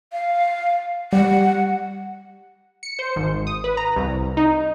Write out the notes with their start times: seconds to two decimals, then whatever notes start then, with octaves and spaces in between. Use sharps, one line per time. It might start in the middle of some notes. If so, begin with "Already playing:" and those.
0.12 F5
1.13 G3 F#5
2.83 C#7
2.99 C5
3.16 G#1
3.47 D#6
3.64 B4
3.77 A#5
3.96 C2
4.37 D#4